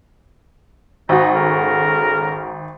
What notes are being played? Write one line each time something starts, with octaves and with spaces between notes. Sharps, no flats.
G#1 D#4 F#4
C#3 A4 A#4